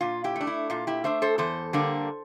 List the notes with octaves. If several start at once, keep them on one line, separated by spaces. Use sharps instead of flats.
A#2 F4
E4 G4
A3 D4
E4
A#2 F4
E4 G4
A3 D4 C5 E5
A4 C5
E2 A4 C5
D3 G3 A#3 D4